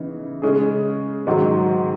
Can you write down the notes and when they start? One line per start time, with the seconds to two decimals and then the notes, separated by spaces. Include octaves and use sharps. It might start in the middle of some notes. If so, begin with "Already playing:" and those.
Already playing: C#3 E3 B3 D#4
0.42 C#3 G#3 C#4 G#4
1.27 G#2 D#3 F#3